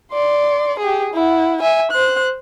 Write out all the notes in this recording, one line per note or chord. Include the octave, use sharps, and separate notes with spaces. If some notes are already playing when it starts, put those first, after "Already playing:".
D5 C6
G4 G#4
E4 F#5
E5 G#5
C5 F#6